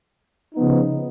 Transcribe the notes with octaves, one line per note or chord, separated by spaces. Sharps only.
C#3 F3 B3 D#4